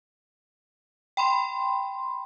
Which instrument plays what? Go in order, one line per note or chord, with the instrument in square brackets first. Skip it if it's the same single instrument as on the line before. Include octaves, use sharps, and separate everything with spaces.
[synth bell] G5 B5 C6